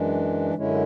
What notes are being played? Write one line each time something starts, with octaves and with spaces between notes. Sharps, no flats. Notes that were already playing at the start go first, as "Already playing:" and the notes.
Already playing: F#2 E3 G#3 D4
F#2 D3 G#3 C#4 E4